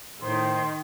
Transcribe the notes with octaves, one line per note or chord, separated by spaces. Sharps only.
A2 D#3 C5 C6